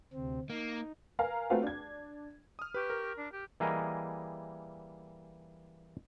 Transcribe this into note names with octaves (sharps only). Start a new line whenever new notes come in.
D2 C3 C4
A#3 D#4
A#4 B4 F5 G#5 A#5
A3 C4 F4 F#4 B4 F5
D4 G#6
D#6 F6
G4 B4 C#6
A#4
D4
G4
E3 G3 A#3 G#4 A#4 D#5